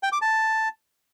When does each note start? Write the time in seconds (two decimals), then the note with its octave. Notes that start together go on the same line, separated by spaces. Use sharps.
0.03 G5
0.12 D6
0.22 A5